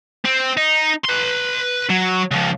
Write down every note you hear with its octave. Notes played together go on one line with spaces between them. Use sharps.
C4
D#4
B4 C6
F#3
C#2 F3